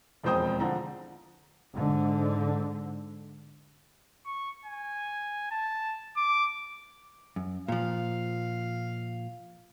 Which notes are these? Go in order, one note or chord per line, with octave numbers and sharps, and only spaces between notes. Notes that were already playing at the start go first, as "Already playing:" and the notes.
E1 F2 G#3 C5 G5 D#6
D3 F3 A#5
G#2 D3
C#6
G#5
A5
D6
F#2
A#2 F3 F5